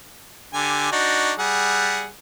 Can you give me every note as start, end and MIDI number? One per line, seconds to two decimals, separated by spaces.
0.53 0.88 50
0.53 0.88 67
0.53 0.88 80
0.92 1.33 62
0.92 1.33 63
0.92 1.33 66
1.39 2.06 55
1.39 2.06 68
1.39 2.06 78